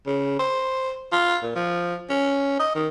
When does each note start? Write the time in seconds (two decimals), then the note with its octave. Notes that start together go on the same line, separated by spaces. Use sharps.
0.06 C#3
0.39 C5
1.12 F4
1.43 A#2
1.55 F3
2.09 C#4
2.60 D#5
2.75 D#3